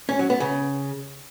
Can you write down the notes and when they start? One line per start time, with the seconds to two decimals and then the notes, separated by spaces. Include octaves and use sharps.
0.09 C#4
0.19 F#3
0.30 B3
0.40 C#3